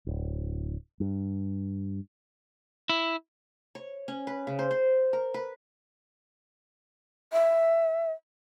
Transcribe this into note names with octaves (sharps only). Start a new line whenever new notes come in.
D1
G2
E4
C#5
C#4
B4
C#3
C5
C5
A#4
B4
E5